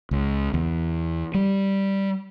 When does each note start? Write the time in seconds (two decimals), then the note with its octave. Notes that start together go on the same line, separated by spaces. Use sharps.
0.11 C#2
0.54 E2
1.34 G3